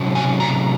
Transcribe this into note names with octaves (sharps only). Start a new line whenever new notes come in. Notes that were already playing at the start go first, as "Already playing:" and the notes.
Already playing: C3 F#3 C#4
G#5
A#5